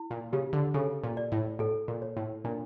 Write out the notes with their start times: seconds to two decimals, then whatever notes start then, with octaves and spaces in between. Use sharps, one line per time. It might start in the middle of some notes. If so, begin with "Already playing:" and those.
Already playing: E4
0.10 A#2
0.33 C#3 G4
0.53 D3
0.74 C#3 A4
1.04 A#2
1.17 D5
1.32 A2
1.59 A2 A4
1.88 A#2
2.02 C#5
2.17 A2
2.44 A#2 D4